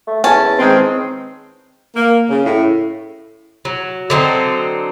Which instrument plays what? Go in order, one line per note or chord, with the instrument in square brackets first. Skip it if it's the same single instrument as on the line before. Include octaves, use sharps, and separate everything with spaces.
[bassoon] A3
[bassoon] E2 [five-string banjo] C#4 E4 [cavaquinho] A5
[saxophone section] D#3 G#3 C4
A#3
C#3
A2
[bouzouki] F#3
D3 F#3 C4 D#4